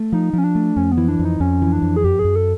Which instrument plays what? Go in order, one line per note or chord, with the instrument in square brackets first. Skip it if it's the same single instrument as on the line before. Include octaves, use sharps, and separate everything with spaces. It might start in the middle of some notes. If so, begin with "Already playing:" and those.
Already playing: [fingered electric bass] A3
[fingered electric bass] F3 [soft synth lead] D#4
[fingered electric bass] F3 [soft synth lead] C#4
[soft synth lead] D4
[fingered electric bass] A3
[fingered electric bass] F2 [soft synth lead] C#4
[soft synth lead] B3
[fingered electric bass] E3
[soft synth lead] D4
[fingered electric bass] F2
[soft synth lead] D#4
[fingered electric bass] F2 [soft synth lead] C#4
[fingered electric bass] E3
[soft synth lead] D4
[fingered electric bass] F2
[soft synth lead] G#4
[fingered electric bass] F#2 [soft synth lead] G4
[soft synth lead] G#4
[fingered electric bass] F#2
[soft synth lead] A4